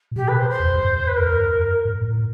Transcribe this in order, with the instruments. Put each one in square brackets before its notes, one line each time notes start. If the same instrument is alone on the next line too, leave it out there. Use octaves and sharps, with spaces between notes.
[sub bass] A#2
[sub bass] B2 [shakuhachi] G4
[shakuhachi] B4
C5
C5
[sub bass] E2
F2
F#2
G2
[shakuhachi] B4
[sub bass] F2 [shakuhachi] A#4
[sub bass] F2
F#2
G#2
A2